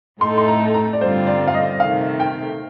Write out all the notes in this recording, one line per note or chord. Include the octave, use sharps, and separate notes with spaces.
A2 A3 D#4 A4 C6
C6
A#5
A#5
D5
G2 D3 G3 C4 F4 C5
D5
F5
D#5
C3 D#3 A3 F5
G5